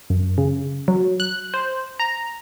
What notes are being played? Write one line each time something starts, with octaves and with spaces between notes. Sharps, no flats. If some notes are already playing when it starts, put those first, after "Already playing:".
F#2
C#3
F#3
F#6
C5
A#5